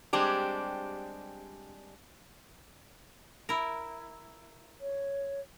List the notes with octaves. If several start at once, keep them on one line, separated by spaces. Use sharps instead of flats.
G3 G#3 C4 D4 G4
E4 A#4
C#5